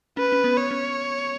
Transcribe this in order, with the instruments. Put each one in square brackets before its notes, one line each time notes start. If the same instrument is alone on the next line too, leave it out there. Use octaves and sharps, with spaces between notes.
[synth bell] C#4 [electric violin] B4
[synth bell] C#4
B3
[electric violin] C#5
[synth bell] C#4